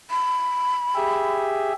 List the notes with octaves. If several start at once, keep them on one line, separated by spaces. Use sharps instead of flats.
B5
G4 G#4 E5